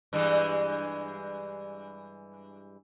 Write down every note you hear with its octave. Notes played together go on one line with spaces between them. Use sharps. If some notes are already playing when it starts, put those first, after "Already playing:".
G2 E3 G#3